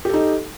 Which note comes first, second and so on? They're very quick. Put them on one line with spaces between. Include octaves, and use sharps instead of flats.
G4 A4 D#4